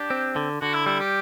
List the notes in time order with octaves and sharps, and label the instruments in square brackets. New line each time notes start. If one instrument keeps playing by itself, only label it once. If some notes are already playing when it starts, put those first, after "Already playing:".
Already playing: [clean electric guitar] D4 [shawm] G4
[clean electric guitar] C4
D3
[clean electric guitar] D3 [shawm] F#4
[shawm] E4
[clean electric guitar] G3 [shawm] E4
[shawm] G4